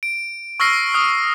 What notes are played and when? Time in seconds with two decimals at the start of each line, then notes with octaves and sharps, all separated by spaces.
0.03 D7
0.60 C#6 E6 F6 A#6 C7
0.94 D#6 F6